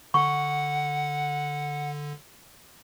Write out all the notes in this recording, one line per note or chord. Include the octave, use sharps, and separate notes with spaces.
D3 F#5 C#6